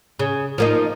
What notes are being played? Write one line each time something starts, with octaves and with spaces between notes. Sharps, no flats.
C#3
F3 A#3 D#4